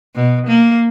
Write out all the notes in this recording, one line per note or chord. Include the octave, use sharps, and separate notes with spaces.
B2
A#3